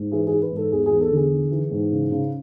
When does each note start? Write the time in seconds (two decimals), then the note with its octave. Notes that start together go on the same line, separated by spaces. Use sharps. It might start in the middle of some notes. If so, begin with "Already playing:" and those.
Already playing: G#2
0.12 E3 G#4
0.27 G#4
0.32 E3
0.42 B4
0.52 G#2 A4
0.72 E2 G#4
0.86 E2 G#4
1.01 A4
1.12 D3 G#4
1.32 E3
1.52 E3
1.71 G#2
1.92 C#3
2.11 C#3